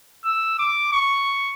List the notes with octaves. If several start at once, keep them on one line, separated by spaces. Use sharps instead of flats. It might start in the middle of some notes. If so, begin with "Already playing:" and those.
E6
D6
C#6